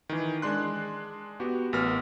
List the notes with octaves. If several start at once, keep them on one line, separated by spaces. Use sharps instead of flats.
D#3 E3
G#3 D4 C6 F#6
B3 F#4 G4
A1 B3 A#4 F6